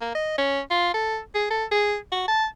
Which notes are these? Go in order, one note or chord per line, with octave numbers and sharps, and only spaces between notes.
A#3
D#5
C#4
F4
A4
G#4
A4
G#4
F#4
A5